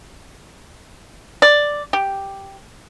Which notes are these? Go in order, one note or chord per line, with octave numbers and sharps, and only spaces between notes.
D5
G4